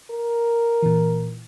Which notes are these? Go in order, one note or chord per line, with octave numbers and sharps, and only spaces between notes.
A#4
A#2 E3